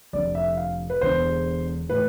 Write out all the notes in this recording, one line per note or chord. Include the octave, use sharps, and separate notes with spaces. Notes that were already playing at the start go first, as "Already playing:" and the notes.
F1 F2 D3 D5
E5
F5
B4
E1 E2 D3 C5
A2 E3 B4